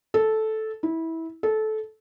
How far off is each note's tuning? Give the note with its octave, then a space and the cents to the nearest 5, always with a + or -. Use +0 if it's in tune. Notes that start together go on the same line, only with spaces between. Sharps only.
A4 -10
E4 -20
A4 -20